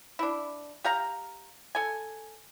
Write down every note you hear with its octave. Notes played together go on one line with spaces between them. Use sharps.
D4 E4
G4 F5 A#5
A4 G#5